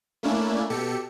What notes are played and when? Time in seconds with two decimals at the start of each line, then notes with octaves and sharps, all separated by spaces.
0.23 A3 A#3 C#4 D4 E4
0.70 B2 G4 A4 C#7